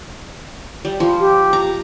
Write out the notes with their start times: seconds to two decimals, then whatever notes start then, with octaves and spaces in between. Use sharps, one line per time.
0.85 G3
1.00 F3
1.19 G4
1.53 A#5